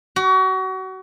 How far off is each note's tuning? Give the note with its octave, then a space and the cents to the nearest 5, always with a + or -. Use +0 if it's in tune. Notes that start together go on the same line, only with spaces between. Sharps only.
F#4 +30